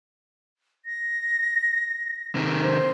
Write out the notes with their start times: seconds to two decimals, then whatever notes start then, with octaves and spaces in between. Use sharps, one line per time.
0.86 A#6
2.35 C3 D#3
2.62 C5